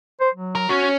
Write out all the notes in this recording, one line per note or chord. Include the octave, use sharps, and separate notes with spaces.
C5
F#3
A#4
C#4 F#4